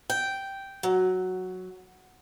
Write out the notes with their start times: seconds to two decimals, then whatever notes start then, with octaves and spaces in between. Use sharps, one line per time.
0.10 G5
0.83 F#3